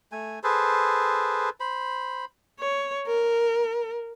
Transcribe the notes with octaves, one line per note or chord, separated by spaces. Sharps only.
A3 G#5
G#4 A4 B4 C5
C5 B5
C#5
A#4